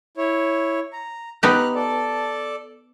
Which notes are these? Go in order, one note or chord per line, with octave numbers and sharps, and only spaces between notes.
E4 C#5
A#5
B3 D#4 G4 F6 F#6
A4 D5 A5